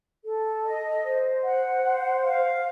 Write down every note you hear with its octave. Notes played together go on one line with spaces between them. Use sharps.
A4
D#5
C5
F#5
C5
F5